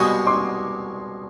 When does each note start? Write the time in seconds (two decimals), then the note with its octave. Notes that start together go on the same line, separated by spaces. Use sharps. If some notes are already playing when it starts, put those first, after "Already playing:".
Already playing: C2 B2 G#3 C#6 D#6
0.27 C6 D6